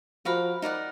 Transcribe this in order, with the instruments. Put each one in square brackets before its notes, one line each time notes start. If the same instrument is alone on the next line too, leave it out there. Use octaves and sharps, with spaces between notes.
[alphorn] F3 [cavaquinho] F#4 A#4 F5 B5
[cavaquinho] D#4 A#4 D5 F#5